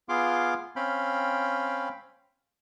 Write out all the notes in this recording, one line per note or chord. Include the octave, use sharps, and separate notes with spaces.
B3 F4 G#4 F5 C6 D6
C4 C#4 F5 G5 B5